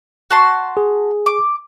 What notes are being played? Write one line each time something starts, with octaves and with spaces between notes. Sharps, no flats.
F#4 A5 C6
G#4
D6